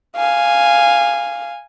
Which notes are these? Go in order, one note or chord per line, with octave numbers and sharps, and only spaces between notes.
F5 G#5